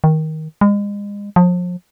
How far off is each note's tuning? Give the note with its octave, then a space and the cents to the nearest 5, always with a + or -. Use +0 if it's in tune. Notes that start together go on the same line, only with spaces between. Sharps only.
D#3 +15
G#3 -35
F3 +35